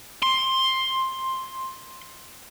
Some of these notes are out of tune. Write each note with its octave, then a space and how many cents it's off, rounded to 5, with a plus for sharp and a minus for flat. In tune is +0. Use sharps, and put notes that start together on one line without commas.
C6 +10